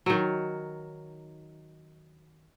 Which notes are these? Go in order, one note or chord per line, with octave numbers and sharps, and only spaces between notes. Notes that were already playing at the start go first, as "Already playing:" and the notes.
D#3 F#3